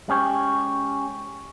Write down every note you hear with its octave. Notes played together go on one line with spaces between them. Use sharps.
G#3 C#4 G4 C#5